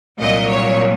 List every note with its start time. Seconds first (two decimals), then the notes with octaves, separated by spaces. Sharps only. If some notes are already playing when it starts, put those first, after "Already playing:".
0.19 C2 A#2 F#3 D#5
0.48 C#5